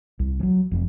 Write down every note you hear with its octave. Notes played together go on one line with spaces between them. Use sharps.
C2
E3 F#3
F1 F2